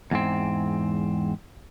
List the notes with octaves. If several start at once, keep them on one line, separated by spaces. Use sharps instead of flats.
E2 G#2 C4